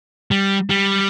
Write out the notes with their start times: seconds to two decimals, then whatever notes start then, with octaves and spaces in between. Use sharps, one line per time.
0.31 G3
0.70 G3